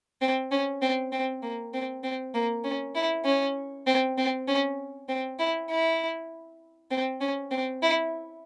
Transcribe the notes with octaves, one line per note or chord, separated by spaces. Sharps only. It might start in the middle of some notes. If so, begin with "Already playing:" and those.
C4
C#4
C4
C4
A#3
C4
C4
A#3
C#4
E4
C#4
C4
C4
C#4
C4
E4
E4
C4
C#4
C4
E4